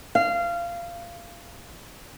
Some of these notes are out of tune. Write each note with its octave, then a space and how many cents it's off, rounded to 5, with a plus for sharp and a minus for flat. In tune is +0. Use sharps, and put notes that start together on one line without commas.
F5 -20